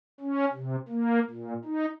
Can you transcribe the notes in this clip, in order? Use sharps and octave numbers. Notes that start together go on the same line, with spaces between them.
C#4
C3
A#3
A#2
D#4